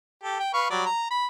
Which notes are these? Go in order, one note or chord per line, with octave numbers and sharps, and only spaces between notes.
G4 A4
G5
B4 F5 C#6
F#3 G3 D5
A#5
B5